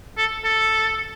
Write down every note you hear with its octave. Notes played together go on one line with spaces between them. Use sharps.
A4
A4